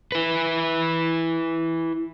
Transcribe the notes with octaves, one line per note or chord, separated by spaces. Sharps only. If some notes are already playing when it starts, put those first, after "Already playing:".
E4 B4